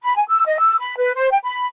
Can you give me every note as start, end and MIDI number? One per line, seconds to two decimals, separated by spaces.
0.02 0.14 83
0.16 0.24 80
0.30 0.44 88
0.47 0.57 75
0.59 0.76 88
0.80 0.95 83
0.97 1.13 71
1.15 1.30 72
1.31 1.39 79
1.44 1.67 83